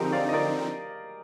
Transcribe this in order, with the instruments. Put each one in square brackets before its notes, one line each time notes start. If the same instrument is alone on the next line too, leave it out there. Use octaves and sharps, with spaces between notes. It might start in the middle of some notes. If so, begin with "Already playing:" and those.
Already playing: [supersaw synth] D3 F3 C4 D#4 [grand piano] G4 G#4 A#4
[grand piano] D5 F5
D#5
A#4 D5